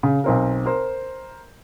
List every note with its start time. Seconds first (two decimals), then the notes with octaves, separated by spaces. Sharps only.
0.03 C#3
0.24 B1 C4 A#4
0.66 A#4 C5